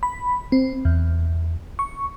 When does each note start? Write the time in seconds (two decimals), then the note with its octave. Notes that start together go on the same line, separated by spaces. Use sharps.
0.03 B5
0.52 C4
0.85 E2
1.79 C#6